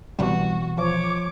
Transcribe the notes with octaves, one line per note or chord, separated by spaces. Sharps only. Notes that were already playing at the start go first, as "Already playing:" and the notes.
C2 B2 E3 G3 F#4
F3 C#5 D6